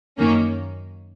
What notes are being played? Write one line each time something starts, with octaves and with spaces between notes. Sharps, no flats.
F#2 D#3 A#3 C#4